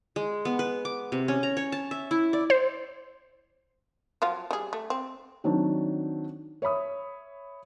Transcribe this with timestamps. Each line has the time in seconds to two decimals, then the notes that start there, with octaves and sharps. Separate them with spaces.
0.16 G#3
0.45 B3
0.59 B4
0.85 D6
1.12 C3
1.28 C#4
1.43 A#5
1.57 C#5
1.72 A5
1.91 E5
2.11 E4
2.33 D5
2.50 C5
4.22 F3 F#3 F4
4.51 G3 G#4
4.73 A3
4.90 C4
5.44 D#3 F#3 C4 D4
6.62 C#5 E5 B5 D#6